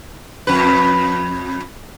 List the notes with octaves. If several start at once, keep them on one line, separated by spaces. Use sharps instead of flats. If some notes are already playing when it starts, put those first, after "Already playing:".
F2 B4